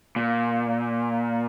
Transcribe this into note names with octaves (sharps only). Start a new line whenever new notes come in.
A#2